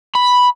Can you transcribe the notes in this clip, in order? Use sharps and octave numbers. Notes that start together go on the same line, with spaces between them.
B5